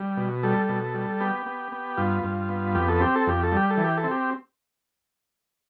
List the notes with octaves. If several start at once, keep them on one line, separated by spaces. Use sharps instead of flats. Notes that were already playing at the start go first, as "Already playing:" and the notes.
Already playing: G3
B2
G3 A4
B2
G3
B3 G4
B3
B3
G2 F4
G2
B3
F2 G4
A4
C4 G4
A4
F2 G4
A4
G3 G4
A4
E3
G4
A4
C4
G4